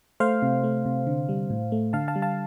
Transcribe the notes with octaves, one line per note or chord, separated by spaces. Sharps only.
A3 C5 F5
C3
A3
C3
D3
G3
A2
A3
D3 F5 A5
F5 A5
G3
F5 A5